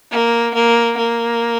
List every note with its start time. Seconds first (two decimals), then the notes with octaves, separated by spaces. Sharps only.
0.11 A#3
0.54 A#3
0.97 A#3